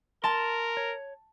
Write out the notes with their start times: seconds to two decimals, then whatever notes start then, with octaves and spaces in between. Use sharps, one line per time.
0.24 A#4 A5 C6
0.77 C#5